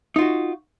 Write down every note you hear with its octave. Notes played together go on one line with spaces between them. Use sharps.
D#4 F4 F#4